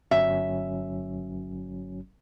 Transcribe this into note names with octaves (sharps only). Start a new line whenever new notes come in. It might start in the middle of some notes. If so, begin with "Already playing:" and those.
G1 F#3 C#4 E5